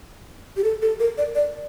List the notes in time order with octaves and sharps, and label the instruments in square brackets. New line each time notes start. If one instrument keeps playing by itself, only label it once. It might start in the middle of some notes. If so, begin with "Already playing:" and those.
[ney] G4
A4
A4
A#4
D5
D5